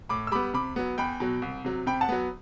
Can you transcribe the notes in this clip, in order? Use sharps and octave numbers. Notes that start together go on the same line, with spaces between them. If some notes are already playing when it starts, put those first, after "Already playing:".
A2 B5 D6
E6
G3 B3 B5 D6
C3 B5 D6
F#3 B3
E2 G5 B5
B2 F#3
C2
C3 F#3
C3 G5 B5
F#5 A5
F#3 B3